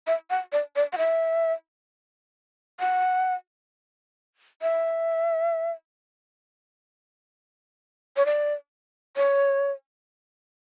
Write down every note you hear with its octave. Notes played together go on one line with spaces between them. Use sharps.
E5
F#5
D5
D5
F#5
E5
F#5
E5
C#5
D5
C#5